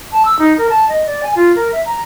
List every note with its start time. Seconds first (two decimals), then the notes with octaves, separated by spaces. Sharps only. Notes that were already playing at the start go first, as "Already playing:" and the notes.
0.12 A5
0.25 E6
0.39 D#4
0.58 A#4
0.69 A5
0.89 D#5
1.06 D5
1.23 G#5
1.36 F4
1.56 A#4
1.72 E5
1.86 A#5